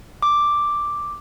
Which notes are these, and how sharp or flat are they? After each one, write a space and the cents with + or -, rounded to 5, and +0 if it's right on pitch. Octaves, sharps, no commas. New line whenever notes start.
D6 +0